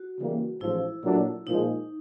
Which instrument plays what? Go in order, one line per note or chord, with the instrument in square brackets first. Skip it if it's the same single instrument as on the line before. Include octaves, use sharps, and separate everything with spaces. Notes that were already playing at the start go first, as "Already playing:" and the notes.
Already playing: [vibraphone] F#4
[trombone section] C#3 E3 G3 A#3
[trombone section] A1 G#2 F3 [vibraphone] E4
[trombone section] A#2 F#3 A3 D4
[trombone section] A#2 F3 G#3 [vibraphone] D#4